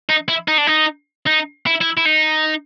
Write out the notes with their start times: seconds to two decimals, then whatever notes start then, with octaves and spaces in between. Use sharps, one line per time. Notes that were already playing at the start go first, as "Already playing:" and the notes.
0.09 D#4
0.28 E4
0.48 D#4
0.58 D4
0.67 D#4
1.27 D#4
1.67 E4
1.81 E4
1.97 E4
2.06 D#4